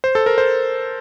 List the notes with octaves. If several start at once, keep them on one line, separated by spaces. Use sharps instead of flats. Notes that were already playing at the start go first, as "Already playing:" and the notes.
C5
A4
A#4
C5